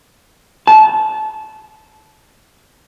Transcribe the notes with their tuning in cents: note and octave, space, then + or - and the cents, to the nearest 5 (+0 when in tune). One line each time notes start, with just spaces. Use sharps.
A5 -20